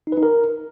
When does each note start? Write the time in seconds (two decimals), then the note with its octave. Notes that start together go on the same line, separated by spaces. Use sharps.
0.07 D#4
0.12 B4
0.17 D#4
0.23 A#4